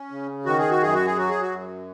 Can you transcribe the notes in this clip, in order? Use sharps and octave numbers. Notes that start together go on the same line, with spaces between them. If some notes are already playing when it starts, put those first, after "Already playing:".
Already playing: C#4
C#3
D#3 F#4
G#4
F#4
F#2 G#4
F#4
G#4
F#3 F#4
G#4
F#4
F#2